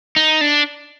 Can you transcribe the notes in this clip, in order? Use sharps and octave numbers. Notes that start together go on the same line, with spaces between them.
D#4
D4